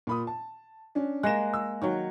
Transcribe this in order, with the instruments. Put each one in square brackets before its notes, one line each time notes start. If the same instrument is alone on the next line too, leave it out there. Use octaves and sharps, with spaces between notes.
[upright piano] A#2 B5 D#6
A5
C#4 D4
[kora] G#3 A#3 [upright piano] F#6 A#6 E7
[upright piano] E6
[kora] D#3 F#3 [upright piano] C#5